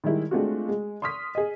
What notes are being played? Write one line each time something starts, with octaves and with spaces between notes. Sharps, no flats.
D#3 G3 G#3 E4
G#3 A3 C4 D4 F4 F#4
G#3
C6 C#6 D#6 F6 B6
G#4 D#5